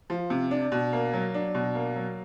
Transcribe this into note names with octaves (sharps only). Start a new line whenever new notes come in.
F3
C3
D4
B2
A#3
F#3
D4
B2
A#3
F#3